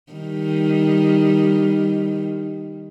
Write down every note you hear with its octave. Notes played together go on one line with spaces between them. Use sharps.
D#3 G3